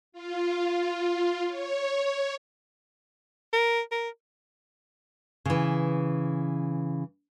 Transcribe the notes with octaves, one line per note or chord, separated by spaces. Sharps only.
F4
C#5
A#4
A#4
C#3 E3